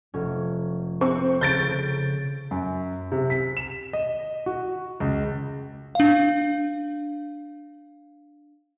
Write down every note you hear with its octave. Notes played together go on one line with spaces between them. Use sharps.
F1 C#4
C4 C#6
C#3 G6 A6 D7
F#2
C3
B6
E7
D#5
F#4
C#2
D4 F5